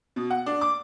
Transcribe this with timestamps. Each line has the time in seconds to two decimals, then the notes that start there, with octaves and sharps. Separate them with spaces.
0.16 B2
0.30 F#5
0.46 D4
0.61 D6